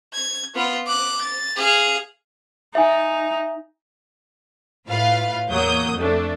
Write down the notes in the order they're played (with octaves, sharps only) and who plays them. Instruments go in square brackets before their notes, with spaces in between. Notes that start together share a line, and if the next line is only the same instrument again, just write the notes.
[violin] G#6
B3 F4
D6 F#6
A6
G#4 F5
[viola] D#4 [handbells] E5 G#5
[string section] A2 F4 B4 F5
E2 F#3 A#3 D#6 G6
F2 A3 D4